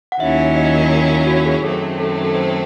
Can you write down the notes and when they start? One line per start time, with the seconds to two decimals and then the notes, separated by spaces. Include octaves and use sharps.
0.12 F#5
0.20 D#2 D#3 F#3 C#4 E4 E5
0.56 D#5
1.27 F#4
1.46 G#4
1.63 F#2 D#3 F#3 A3 C4 A4
2.00 A4
2.24 A4
2.35 C5